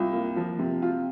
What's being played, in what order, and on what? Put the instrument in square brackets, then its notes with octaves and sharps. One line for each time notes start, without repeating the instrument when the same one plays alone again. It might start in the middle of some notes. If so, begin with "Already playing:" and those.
Already playing: [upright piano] C2 [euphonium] F4
[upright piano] A#3
F3
C3
F4